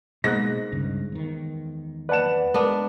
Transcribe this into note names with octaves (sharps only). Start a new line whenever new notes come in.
G#2 B2 A#3 F#6 A#6
C#2 G2 C#3
E2 D#3
B4 D5 F#5 A5 E7
G#3 B3 D4 A#4